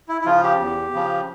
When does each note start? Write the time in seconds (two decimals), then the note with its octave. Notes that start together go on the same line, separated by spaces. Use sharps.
0.09 E4
0.21 E4
0.26 C#3 F3 F4
0.43 G4
0.60 E2
0.94 C#3 F3